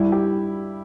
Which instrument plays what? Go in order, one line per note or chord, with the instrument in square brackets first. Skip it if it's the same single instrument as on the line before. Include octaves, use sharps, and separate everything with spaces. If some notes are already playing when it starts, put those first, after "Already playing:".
Already playing: [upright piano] G2 G3 E4
G4